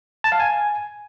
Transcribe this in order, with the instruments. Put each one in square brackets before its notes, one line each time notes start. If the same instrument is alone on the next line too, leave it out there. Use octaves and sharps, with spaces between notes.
[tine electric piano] A5
F5
G#5